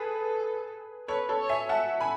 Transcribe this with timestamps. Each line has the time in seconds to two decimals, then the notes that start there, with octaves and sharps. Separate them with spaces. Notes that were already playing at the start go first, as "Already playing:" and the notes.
Already playing: G#4 A4 B4
1.08 A4 B4 C#5
1.29 A4 C#5
1.39 C#5
1.49 E5 G#5
1.69 E5 F#5 A5
2.01 G#5 B5